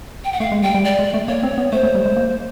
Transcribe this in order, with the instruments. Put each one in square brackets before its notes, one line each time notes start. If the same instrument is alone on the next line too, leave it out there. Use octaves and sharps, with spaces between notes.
[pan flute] G5
F#5
[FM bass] A3 [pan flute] F5
[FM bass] G#3
[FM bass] G3 [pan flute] G5
[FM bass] G3
[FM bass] G#3 [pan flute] D5
[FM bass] G#3
A3
[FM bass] A#3 [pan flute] C#5
[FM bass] C4
B3
[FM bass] A3 [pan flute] C5
[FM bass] A3
G3
G#3
A#3